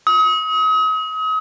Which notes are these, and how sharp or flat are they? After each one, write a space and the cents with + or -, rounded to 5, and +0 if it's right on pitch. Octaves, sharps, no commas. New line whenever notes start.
D#6 +40